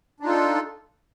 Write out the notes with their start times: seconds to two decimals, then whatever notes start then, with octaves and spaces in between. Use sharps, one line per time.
0.20 D4
0.23 D#4
0.26 F4
0.29 A4